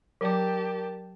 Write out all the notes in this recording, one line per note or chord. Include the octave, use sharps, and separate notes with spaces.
F#3 G4 A#4 D5 A5 D6